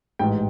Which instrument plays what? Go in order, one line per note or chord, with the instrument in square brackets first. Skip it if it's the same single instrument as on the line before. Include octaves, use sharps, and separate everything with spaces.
[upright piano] A1 G#2 E3 G5